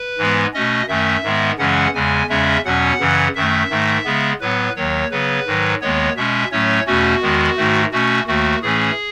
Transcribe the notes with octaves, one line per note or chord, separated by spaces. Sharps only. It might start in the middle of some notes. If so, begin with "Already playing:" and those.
Already playing: B4
G#2 E3 G#3 B3
B2 A3 C#4 D#5
F#2 D#3 A3 C#4 E5
G#2 D#3 G#3 B3
F#2 C#3 E3 G#3 C#4 F#5
E2 C#3 G#3 G#5
E2 C#3 G#3 C#4 E5
E2 B2 F#3 C#4 F#5
F#2 C#3 E3
F#2 D#3 A3 E5
G#2 D#3 A3
C#3 G#3 B3
A2 F#3 B3 B4
D#2 D#3 F#3 C#5
C#3 F#3 B3 B4
G#2 D#3 F#3
D#2 D#3 G#3 B3 C#5
B2 G#3 C#4 E5
A2 F#3 A3 C#4 C#5
E2 B2 A3 C#4 F#4
E2 D#3 G#3 B3
G#2 D#3 A3
B2 A3 C#4 F#4
D#2 D#3 A3 F#4
A2 E3 A3 C#4 G#4